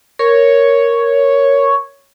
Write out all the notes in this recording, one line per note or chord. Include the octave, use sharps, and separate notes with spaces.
A#4 C#5